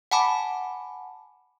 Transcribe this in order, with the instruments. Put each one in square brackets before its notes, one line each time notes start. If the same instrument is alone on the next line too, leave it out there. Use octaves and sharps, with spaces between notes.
[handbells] F#5 G#5 A5 B5 D6